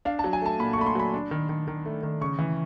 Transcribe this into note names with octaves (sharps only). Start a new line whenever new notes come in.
D4 F5
A5
F#3
G#5
A3 A5
A#2 B5
C#6
A3 B5
C6
F#3 B5
D4
D#3
D#3
D#3
A3
D#3
C#3 C#6
E3